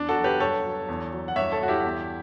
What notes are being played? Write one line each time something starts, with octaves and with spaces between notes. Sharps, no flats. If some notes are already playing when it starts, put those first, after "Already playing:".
Already playing: E2 D4
F#4 A4
F#3
G4 B4
G2 A4 C#5
F#3
E2
F#3
F#5
G2 C#5 E5
A4 C#5
G2 F#4
E4 G4
E2